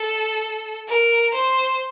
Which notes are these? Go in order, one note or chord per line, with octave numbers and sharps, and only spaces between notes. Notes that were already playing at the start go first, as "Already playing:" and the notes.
Already playing: A4
A#4
C5